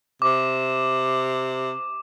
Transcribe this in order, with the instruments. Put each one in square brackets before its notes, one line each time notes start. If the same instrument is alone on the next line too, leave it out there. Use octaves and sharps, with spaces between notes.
[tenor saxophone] C3 [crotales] D6